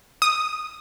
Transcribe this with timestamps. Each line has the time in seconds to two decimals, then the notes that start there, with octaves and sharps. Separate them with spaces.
0.22 D#6